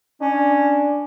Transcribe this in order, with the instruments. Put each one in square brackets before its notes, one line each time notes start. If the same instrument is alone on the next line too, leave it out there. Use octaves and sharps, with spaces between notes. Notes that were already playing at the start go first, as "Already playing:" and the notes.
[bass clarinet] C#4 [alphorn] D4